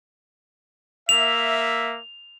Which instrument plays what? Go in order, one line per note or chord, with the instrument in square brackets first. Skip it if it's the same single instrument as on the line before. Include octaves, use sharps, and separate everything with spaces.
[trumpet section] A#3 E5 [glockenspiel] F7